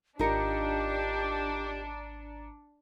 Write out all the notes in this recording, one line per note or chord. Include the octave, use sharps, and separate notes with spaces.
G#1 D4 D#4 F4 G4 A#4 A#5 C#7